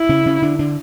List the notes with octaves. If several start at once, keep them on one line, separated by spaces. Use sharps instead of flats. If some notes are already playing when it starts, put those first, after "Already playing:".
Already playing: E4
C#3 C#4
C#3 C#4
D3 D4
D3 D4